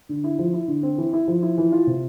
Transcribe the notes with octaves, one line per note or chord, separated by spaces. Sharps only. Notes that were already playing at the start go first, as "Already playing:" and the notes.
D3
E4
F3
E4
D3
C4
E3
E4
F3
E4
E3
F4
C3